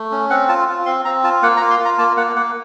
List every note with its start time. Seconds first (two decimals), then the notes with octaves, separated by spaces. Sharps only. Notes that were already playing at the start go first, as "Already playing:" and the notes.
Already playing: A3
0.12 C#4
0.30 C4 F#5
0.49 F4 A5
0.68 F4
0.86 C4 C6
1.05 C4 A#5
1.23 F4 A5
1.43 A#3 F#5
1.57 A#5
1.61 F4
1.70 C6
1.79 F4
1.85 A#5
1.98 A#3 A5
2.17 A#3 F#5
2.36 A#3 F#5